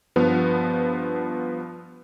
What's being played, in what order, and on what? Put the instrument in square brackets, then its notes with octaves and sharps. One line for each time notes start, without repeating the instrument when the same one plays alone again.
[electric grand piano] G2 F3 B3